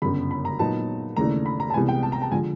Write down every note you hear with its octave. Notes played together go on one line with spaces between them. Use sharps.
G1 F#2 C#3 B5
B5
A#5
A#2 F#3 B3 D#4 A5
D#2 C#3 E3 A3 D4 A#5
B5
A#5
A5
C2 C3 E3 G#3 B3 G#5
G5
A5
A#5
A5
D3 F3 G#3 G#5